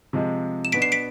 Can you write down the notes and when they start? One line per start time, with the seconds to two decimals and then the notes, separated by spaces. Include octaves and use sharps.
0.13 C3 F3 G#3
0.65 E7
0.72 B2 B3 D4 B6 D7
0.82 C7 E7
0.92 B6 D7